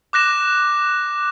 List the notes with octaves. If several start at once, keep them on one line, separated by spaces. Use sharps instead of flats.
D6 F#6 A#6 E7